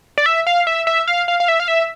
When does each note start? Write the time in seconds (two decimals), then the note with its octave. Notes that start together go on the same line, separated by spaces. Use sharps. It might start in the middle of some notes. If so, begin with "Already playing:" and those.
0.18 D5
0.26 E5
0.47 F5
0.67 E5
0.87 E5
1.08 F5
1.28 F5
1.40 F5
1.48 E5
1.60 F5
1.68 E5